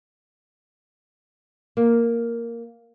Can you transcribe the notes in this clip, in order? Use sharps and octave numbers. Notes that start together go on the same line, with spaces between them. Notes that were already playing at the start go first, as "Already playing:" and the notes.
A#3